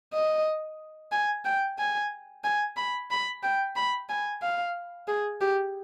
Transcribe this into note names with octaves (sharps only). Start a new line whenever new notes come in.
D#5
G#5
G5
G#5
G#5
B5
B5
G5
B5
G#5
F5
G#4
G4